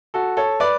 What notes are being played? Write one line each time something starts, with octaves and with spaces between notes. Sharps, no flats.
F#4 A4
A4 C#5
B4 D5